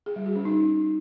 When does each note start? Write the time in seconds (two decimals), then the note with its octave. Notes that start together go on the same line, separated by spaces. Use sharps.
0.06 G#4
0.16 G3
0.26 F#4
0.36 C#4
0.45 D#4